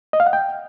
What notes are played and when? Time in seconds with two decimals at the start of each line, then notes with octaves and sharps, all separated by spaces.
0.13 D#5
0.20 F5
0.26 F#5
0.33 G5